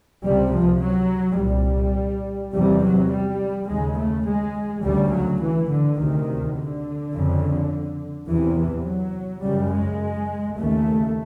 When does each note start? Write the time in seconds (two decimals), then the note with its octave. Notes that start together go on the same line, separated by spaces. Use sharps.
0.24 C#2 C3 G3
0.53 F3
0.81 F#3
1.39 C2 A#2 G3
2.54 E2 C3 G3
2.82 F#3
3.12 G3
3.69 D#2 C#3 G#3
3.98 A3
4.26 G#3
4.84 D2 C#3 G3
5.12 F#3
5.41 E3
5.70 D3
5.99 D2 C3 D#3
6.57 D3
7.14 F2 C#3
8.29 E2 C3 E3
8.58 E3
8.87 F#3
9.44 F#2 C#3 G3
9.72 G#3
10.58 D#2 C#3 A3